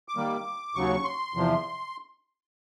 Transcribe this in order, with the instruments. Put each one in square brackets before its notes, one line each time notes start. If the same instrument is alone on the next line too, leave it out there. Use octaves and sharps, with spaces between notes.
[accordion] D6
D#3 G3 A#3
D#2 C#3 F#3 C#6
C6
E2 C3 F3